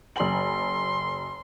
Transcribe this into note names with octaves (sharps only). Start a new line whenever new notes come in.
F#1 C6 F#7